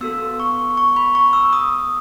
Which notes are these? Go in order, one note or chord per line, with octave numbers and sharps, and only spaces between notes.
B3 F#4 A4 E6
C#6
C#6
B5
C#6
E6
D#6